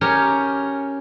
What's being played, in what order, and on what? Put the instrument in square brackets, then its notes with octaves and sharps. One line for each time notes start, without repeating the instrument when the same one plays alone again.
[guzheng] C#4 G4 A#4 C#5